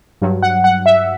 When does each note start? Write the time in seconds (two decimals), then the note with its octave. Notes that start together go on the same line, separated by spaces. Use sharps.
0.22 G2 F#3
0.42 F#5
0.64 F#5
0.86 E5